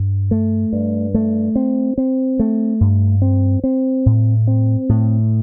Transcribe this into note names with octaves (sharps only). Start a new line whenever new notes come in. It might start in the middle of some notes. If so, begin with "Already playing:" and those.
Already playing: G2
A3
G2
A3
C4
C4
A3
G2
C4
C4
A2
C4
A2